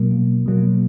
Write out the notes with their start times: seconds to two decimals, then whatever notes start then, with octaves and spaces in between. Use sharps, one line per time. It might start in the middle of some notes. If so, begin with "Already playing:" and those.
Already playing: B2 F#3 A#3
0.46 B2 F#3 A#3